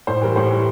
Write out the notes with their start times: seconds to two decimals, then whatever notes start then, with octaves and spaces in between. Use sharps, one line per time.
0.07 A2 C5
0.22 E3 G3 A#4
0.36 A2 C5
0.50 E3 G3